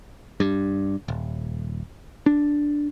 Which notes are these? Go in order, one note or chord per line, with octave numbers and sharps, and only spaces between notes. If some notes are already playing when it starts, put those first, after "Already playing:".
G2
D#1
D4